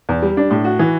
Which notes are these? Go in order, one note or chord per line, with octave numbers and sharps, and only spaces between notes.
E2
G3
D4
A2
F#4
E3